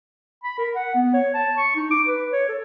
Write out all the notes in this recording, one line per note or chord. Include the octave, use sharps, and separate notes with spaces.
B5
A#4
F#5
B3
C#5
A5
C#6
D#4
D6
B4
C#5
A4